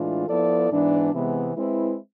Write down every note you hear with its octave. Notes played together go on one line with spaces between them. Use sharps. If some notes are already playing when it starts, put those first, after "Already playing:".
Already playing: A2 E3 G#3 D4 F4
F3 B3 E4 A4 D5
G#2 E3 B3 D4
C3 E3 G#3 B3
G#3 C4 E4 B4